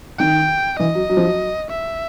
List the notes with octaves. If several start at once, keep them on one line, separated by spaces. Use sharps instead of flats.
D#3 G5
E3 D#5
F#3
F#3
F3
F#3
E5